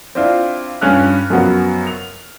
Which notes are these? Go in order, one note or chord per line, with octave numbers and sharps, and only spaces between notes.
C4 D4 E4 F4
G2 C#4 F4 F6 F#6
F#2 F3 F#3 B3
F7